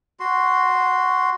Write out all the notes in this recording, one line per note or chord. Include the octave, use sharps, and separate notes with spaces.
F#4 C6